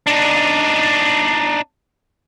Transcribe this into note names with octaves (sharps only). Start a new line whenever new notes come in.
D4 D#4